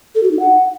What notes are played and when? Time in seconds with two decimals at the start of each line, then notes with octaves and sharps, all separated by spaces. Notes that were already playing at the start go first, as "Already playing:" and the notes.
0.15 A4
0.23 F#4
0.31 D#4
0.39 F#5